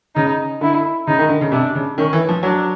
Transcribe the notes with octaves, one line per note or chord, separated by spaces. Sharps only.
C#3 D#4
D3 E4
C#3 D#4
D#3
D3
C#3
C3 D4
C#3
D#3 C#4
E3
F3
F#3 D4